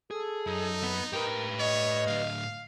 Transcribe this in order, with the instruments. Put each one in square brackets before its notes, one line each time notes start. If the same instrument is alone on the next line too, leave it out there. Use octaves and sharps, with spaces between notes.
[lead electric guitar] G#4 [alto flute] A4
[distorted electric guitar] F#2 [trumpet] D#4
[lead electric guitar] B3 B4
[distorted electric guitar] A2 G5 [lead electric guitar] G4 B4 [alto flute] A#4
[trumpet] C#5 [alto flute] D#5
[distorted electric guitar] A2 D3 [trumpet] F5